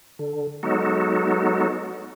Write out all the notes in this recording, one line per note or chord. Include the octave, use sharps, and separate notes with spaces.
D3
F#3 G#3 B3 D#4 F#4 A4